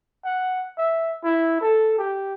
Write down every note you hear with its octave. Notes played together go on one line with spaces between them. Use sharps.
F#5
E5
E4
A4
G4